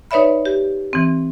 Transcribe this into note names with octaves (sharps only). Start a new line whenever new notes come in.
D#4 B4 C#5 D5 E5 B5
G4
E3 C4